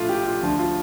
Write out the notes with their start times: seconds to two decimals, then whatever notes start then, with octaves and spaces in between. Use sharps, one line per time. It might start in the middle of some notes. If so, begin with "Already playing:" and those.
Already playing: A#1 A2 A3 F4
0.09 G4
0.26 F4
0.43 D2 D3 F3
0.59 F4